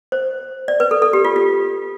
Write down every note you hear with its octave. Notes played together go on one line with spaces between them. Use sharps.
C5
D5
B4
A4
A4
G4
F4
F4